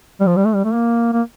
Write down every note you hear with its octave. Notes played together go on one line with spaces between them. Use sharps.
G3
F3
G3
A3
G3
A3
A#3
A#3